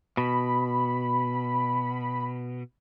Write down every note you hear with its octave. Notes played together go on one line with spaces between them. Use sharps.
B2 B5